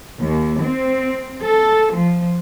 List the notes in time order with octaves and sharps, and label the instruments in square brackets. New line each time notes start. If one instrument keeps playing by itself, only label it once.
[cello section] D#2
C4
A4
F3